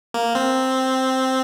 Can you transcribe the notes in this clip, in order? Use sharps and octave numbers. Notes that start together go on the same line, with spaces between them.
A#3
C4